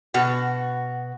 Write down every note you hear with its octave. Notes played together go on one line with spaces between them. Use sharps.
B2 F#4